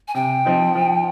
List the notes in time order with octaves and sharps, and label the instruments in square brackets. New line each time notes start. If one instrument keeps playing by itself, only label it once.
[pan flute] G#5
[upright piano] C3 [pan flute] G5
[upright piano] F3 C4 D#4
F3